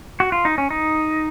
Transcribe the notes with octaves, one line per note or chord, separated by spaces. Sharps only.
F#4
F4
D#4
C#4
D#4